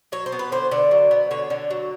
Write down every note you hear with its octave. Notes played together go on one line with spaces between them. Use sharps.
F#3 C#5
C5
B3
B4
D3 C5
D3 D5
F#3
B3
D3 C#5
D3
F#3